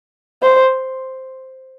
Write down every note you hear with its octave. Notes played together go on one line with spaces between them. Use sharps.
C5